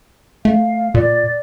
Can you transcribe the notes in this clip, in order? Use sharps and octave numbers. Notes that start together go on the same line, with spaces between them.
A3 F5
A#2 D5